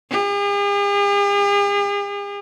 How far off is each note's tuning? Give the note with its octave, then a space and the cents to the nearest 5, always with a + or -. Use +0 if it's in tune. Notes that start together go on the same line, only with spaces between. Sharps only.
G#4 -45